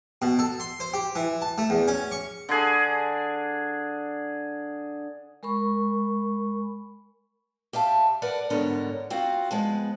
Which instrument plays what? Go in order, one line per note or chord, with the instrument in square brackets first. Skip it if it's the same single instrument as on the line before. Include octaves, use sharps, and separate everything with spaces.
[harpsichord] B2
A4
C6
C5
G4
E3
A5
A3
E2
C#4
C#6
[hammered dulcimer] D3 D4 G#4
[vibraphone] G#3 A#4 B5 C#6
[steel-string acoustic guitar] G4 E5 F5 A5
A#4 B4 D5 F#5
G#2 D3 G3 B3 A#4 C#5
C4 F4 F#4 F5
F3 G#3 B3